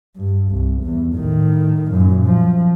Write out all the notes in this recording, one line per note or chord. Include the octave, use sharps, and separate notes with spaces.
G2
C2
E2
A2 D#3
F#2 A#2
F3